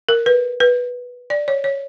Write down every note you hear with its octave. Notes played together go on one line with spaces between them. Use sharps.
A#4
B4
B4
D5
C#5
C#5